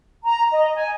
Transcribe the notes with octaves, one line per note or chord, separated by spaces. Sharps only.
A#5
D#5
G#5